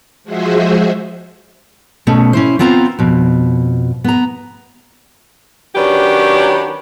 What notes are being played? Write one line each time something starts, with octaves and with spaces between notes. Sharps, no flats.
F3 G#3 F#4 G#4 C5 E5
B2 A3 C#4
C#4 E4 C5
B3 C4 F4 C5 A#5
F2 B2
B3 A#5
D#3 F#3 C#4 D4 G4 B4